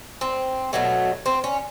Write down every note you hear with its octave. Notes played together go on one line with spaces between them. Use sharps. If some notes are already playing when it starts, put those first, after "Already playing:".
C4
B2 F#3 A3
C4
C#4